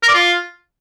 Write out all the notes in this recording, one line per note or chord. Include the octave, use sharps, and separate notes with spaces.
A#4
D5
F4